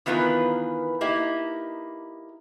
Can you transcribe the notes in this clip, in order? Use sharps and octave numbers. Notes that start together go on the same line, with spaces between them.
D#3 E3 B3 F4 A#4 B4
A#3 D#4 E4 G4